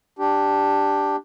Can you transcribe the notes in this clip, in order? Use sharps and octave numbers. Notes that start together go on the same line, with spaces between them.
D4 G4